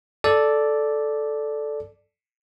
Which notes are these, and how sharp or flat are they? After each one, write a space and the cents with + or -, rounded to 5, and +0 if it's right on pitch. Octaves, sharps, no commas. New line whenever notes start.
A4 -5 D5 +0